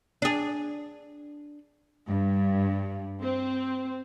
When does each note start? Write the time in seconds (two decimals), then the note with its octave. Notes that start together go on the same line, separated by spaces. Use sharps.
0.22 D4 G#4
2.08 G2
3.22 C4